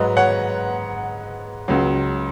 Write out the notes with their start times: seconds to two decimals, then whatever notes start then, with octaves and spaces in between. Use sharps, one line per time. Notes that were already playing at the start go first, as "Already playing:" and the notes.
Already playing: G#2 F#3 B4 D#5
0.17 C#5 F#5
1.68 C#2 C#3 F#3